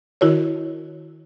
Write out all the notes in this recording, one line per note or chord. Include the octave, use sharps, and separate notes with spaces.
D#3 E4 F#4 A#4 C#5